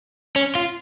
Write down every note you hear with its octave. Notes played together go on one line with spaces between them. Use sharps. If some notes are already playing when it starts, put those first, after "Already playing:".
C#4
F4